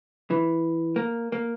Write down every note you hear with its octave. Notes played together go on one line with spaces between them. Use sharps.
E3
A#3
A#3